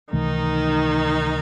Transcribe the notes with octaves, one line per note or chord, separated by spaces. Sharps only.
C#2 C3 D#3 E3 A3 D#4